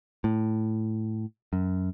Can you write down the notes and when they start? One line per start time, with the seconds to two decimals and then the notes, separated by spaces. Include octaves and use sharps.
0.24 A2
1.53 F#2